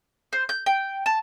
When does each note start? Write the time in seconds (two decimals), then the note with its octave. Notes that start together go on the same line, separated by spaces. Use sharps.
0.33 C5
0.49 G6
0.66 G5
1.06 A5